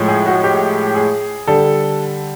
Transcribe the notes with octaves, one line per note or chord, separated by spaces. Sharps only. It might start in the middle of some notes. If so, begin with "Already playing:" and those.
Already playing: A2 F3 G#3
G#4
F#4
G4
G#4
D3 G3 A4